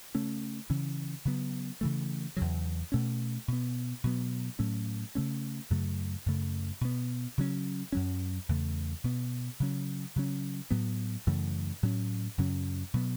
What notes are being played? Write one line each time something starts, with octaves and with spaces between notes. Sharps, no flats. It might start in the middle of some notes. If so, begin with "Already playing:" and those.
C#3 A3 C#4
C#3 E3 C#4
C#3 F#3 B3
C#3 E3 A3
E2 C#3 F#3
B2 A3 C#4
B2 B3
B2 F#3 B3
A2 F#3 A3 C#4
C#3 A3 C#4
F#2 C#3 F#3 A3
F#2 C#3 A3
B2 B3
C#3 F#3 C#4
F#2 F#3 C#4
E2 C#3 A3
B2 B3
C#3 F#3 C#4
C#3 F#3 C#4
A2 F#3 B3
F#2 C#3 E3 A3
A2 F#3 C#4
F#2 C#3 F#3 C#4
B2 F#3 B3